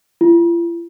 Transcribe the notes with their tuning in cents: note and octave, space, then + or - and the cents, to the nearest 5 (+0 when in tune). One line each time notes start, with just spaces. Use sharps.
F4 -45